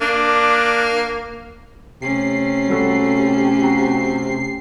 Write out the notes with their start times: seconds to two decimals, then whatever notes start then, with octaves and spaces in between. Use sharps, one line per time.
0.01 A#3 D4
2.02 C3 A3 C#4 C7
2.68 G3 F#4 A4
3.60 C4 F#4 A#5